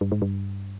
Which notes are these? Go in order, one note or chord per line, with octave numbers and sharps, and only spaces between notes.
G2
G#2
G2